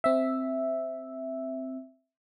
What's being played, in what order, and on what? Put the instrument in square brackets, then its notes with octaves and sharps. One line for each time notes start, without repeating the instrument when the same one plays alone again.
[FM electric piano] C4 E5